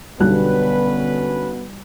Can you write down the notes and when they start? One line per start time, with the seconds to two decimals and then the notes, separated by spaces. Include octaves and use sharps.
0.20 B1 D3 G3 B3 C#4 B4 F#6